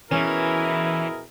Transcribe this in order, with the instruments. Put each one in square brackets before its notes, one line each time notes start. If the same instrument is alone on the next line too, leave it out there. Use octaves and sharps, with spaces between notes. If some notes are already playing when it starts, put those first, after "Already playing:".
[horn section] B2 G#4 A#4 [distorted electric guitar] E3 [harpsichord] C#4 [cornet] E4